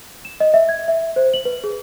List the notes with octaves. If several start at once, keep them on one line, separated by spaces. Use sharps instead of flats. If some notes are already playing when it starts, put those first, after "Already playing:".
E7
D#5
E5
G#6
E5
C5
F#7
B4
G#4